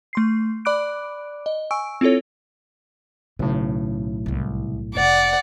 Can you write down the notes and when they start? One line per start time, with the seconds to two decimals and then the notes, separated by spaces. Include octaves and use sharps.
0.13 A3 C6 C7
0.65 D5 B5 D6 F#6 D7
1.46 D#5
1.71 G#5 C#6 E6 D7
2.01 C4 E4 F4 A4 C#5
3.39 B1 A2 C#3
4.26 C2 B2
4.95 F1 C3 D5 F#5